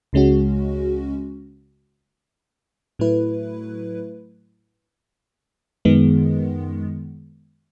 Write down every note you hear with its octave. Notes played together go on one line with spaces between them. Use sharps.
C#2 C#3 G#3 C#4 F#4
A2 F#3 A3 E4 B4
F#2 D#3 G#3 B3